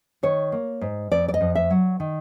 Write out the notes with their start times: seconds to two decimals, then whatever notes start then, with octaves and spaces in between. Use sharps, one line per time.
0.23 D#3 C#5
0.52 A#3
0.81 G#2
1.11 F2 D5
1.28 D5
1.34 D#5
1.41 F2
1.55 E5
1.71 F#3
2.00 D#3